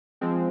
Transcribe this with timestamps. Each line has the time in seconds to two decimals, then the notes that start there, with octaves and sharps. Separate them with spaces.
0.21 F3 G#3 C4